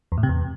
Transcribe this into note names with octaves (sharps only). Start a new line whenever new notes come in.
E2
A2
C3
E2